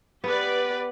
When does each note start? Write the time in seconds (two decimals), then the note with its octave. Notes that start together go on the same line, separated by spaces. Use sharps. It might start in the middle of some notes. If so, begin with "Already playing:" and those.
0.24 B3 G4 B4 D5